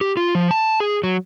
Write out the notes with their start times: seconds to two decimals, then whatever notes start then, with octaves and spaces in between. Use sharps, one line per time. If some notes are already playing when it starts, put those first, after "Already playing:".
0.01 G4
0.17 F4
0.35 F3
0.51 A5
0.80 G#4
1.04 F#3